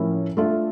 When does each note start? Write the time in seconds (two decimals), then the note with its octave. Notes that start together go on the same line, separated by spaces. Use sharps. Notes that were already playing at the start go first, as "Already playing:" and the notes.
Already playing: A2 F3 C#4 E4 A#4
0.37 A3 D4 F4 A4 E5